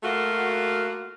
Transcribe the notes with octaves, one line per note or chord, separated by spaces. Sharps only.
A3 A#3 F4 F#4